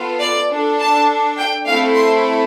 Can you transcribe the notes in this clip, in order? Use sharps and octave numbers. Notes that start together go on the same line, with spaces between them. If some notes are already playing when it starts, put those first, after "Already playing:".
Already playing: B3 F4 A4
D5
D4 A4
A5
G5
A3 C4 E4 A4 F5
C6